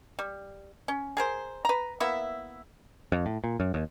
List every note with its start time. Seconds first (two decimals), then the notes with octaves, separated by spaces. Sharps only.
0.19 G3
0.88 C#4
1.17 G#4 A#4 C5
1.65 B4 A#5
2.00 A#3 B3 E4 E5
3.12 F2
3.26 A2
3.44 A#2
3.60 F#2
3.74 D#2